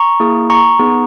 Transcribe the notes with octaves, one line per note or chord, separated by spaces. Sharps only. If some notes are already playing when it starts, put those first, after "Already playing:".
Already playing: A#5 C#6
A#3 E4 G#4
A#5 C#6
B3 D#4 G#4